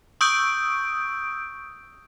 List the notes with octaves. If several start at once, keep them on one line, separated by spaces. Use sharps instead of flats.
C#6 D#6 E6 G6 D7